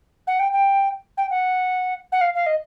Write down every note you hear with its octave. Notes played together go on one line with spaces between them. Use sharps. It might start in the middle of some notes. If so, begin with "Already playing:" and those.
F#5
G5
G5
G5
F#5
F#5
F5
F5
D#5